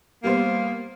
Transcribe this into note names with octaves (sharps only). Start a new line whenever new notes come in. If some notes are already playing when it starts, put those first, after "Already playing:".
G3 A#3 B3 C5